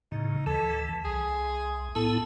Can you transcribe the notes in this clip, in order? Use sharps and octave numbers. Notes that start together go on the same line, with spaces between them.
A2 C#3 D#4
D2 E3 A4
C2 G#4
A2 B3 E4 A4